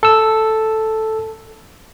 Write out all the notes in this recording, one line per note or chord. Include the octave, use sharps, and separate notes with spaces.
A4 E6